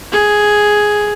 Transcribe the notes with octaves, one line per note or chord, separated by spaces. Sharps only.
G#4